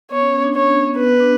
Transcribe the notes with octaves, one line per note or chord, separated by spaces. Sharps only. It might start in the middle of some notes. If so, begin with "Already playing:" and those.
B3 C#5
C#4
C#4
D4
D4 C#5
C#4
B3
B3 B4
D4